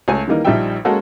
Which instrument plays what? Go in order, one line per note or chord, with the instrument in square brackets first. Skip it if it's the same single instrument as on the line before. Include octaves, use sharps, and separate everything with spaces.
[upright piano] C#2 A3 C#5 G#5
D#3 E3 G3 A#3 D#4
A#1 F3 G3 D#4 E5 G5
G#3 A#3 C#4 F#4 A4